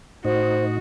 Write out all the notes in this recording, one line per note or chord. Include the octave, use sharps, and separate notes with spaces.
A2 D#4 F#4 C5